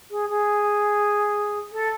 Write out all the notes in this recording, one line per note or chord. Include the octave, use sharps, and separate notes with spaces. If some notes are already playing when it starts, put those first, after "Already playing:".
G#4
G#4
A4